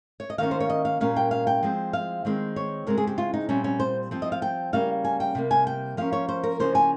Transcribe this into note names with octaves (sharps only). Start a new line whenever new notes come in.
C#5
D#5
D#3 A#3 C#4 F5
C5
C#5
D#5
F5
A#2 G3 A#3 C#4 F5
G5
F5
G5
F3 G#3 C4
F5
D#3 G#3 C4
C#5
C#3 G#3 C4 A#4
G#4
G4
F4
D#4
A#2 G3 C4 C#4
C#4
C5
F3 C4
D#5
F5
G5
C#3 G3 A#3 C#4 F5
G#5
G5
C3 G3 A#3
G#5
G5
F3 A#3 C#4 F5
C#5
C5
A#4
C#3 F3 A#3 C#4 C5
G#5